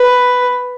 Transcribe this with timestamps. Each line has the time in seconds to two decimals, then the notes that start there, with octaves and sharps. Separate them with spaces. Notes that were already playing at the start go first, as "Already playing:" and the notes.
Already playing: B4